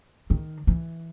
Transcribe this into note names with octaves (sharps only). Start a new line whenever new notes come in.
D#3
E3